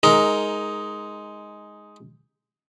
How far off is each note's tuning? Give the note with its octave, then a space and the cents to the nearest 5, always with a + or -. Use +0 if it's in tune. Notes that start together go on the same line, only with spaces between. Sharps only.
G#3 +5 D#4 +10 A#4 -5